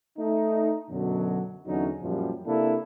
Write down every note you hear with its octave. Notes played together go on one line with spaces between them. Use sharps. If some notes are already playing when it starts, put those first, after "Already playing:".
A3 D#4
F#2 B2 D3 F#3
E2 D3 F#3 C#4 D#4
F#2 A#2 F3 G3
C3 A#3 D4 E4 A4